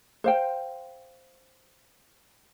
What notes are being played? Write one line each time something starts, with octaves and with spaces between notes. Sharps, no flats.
C5 F5 G5